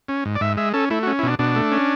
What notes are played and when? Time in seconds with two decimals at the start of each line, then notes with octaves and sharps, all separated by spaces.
0.09 C#4
0.25 G#2
0.35 D5
0.41 G#2 E5
0.57 G#3 E5
0.73 C#4 A4
0.90 A3 E4
1.03 F#4
1.07 C#4
1.19 E4
1.23 B2 D4
1.39 B2 D4
1.55 A3
1.72 C#4